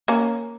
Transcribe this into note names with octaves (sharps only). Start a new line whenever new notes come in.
A#3 C#4